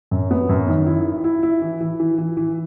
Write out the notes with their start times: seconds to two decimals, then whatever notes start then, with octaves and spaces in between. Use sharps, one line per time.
0.11 F#2
0.31 B3
0.49 F#2
0.68 D#3
0.86 E4
1.05 E4
1.24 E4
1.43 E4
1.62 E3
1.81 E3
2.00 E3
2.18 E3
2.37 E3